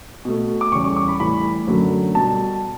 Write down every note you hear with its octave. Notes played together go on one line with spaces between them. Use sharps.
B2 A3
D6
E2 C#3 G3 C#6
C#6
D6
B5
A2 E3 G3 B5
F#2 D3 F#3 A3
B2 G3 A5